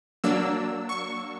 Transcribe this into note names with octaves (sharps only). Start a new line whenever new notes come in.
F#3 A#3 D4 E6
C#6